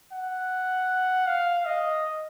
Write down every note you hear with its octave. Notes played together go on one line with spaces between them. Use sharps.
F#5
F5
D#5